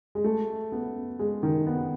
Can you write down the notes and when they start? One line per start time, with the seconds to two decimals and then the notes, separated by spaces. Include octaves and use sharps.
0.15 G#3
0.24 A3
0.72 B3
1.19 G#3
1.43 D#3
1.67 B3